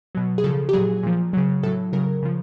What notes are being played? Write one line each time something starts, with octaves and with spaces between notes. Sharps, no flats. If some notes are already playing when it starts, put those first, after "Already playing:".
B2 F#3
G#4
C#3 F3 A4
G4
A#2 F#3 G#4
A#2 F3
C#3 F#3
A2 F#3 A4
C#3 F#3 A#4
C#3 F3